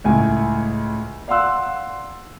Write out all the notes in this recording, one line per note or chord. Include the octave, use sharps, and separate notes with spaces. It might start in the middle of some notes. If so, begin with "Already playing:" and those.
C#2 A2 G#5
D5 F5 F#5 C6 E6 F#6